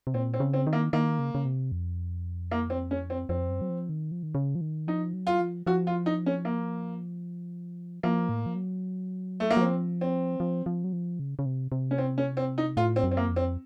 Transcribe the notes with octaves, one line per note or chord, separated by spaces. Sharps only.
C3
A#2 C4
C4
C#3
C4
D#3
A#3
D#3 A#3
C#3
C#3
C3
F2
A#3
C4
C#4
C4
F2 C4
F#2
F#3
F3
D#3
F3
D#3
C#3
F3
D#3
F3 D#4
F#3
F4
F3
F3 F#4
F4
D#4
C#4
A#3
F3 A#3
A2
F3
F#3
A3
A#3
F#3
F3 C4
C4
F3
F3
F#3
F3
C#3
C#3
C3
C3
C#4
C4
C#4
C4
D#4
A2 F4
C4
F#2
C4
A#3
F2
C4